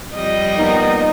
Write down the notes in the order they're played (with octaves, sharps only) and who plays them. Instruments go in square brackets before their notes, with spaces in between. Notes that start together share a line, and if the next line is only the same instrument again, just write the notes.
[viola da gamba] F2 G3 D#5
[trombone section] A#3 B3 D#4